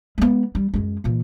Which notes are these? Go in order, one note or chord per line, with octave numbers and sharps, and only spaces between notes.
G#3 B3
G3
F#2 G#3
A#2 E3